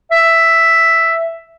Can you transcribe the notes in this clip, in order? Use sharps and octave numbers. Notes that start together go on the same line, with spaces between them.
E5